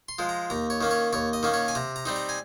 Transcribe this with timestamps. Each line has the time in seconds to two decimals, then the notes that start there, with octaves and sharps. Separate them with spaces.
0.08 C6
0.19 F3 G#3
0.29 A#5
0.50 D#2 A#5
0.70 C#5
0.81 D#3 A#3 C#4
0.91 C#5
1.13 D#2 C#5
1.33 D#5
1.43 D#3 A#3 C#4
1.54 C#5
1.68 G#5
1.75 C3 A#5
1.96 A#5
2.05 G3 C4 D#4
2.16 A#5
2.29 G#5